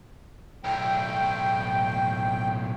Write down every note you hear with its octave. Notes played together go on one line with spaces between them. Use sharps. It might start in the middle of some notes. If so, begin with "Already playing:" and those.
B1 A2 G5